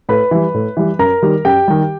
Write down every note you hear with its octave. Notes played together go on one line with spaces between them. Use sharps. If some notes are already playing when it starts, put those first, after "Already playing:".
A2 B4 B5
E3 G3
A2
E3 G3
F#2 A#4 A#5
D#3 G3
F#2 G4 G5
D#3 G3